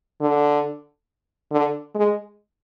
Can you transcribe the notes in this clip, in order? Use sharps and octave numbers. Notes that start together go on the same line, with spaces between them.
D3
D3
G#3